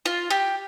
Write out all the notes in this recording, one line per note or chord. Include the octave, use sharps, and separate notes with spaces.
F4
G4